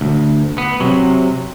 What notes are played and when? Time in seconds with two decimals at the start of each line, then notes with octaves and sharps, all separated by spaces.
0.01 D2
0.58 B3
0.80 C3 F#3